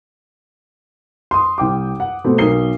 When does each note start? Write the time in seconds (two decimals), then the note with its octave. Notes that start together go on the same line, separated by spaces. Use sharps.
1.31 C6 D#6
1.58 C2 G5 D6
2.00 F#5
2.24 B2 A3 B3 C4
2.38 B1 A#4 D#6 C7 G7